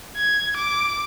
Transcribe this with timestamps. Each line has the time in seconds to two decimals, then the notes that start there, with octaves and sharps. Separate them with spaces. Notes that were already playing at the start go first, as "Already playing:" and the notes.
0.18 G#6
0.57 D6